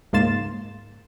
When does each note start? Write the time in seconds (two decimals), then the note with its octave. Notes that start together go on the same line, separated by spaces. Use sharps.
0.13 C#2 G#2 A#3 C6 A6 E7